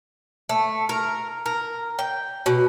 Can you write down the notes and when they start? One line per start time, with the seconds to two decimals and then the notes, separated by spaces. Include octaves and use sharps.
0.49 A3
0.89 A#4
1.46 A#4
1.99 G5
2.46 B2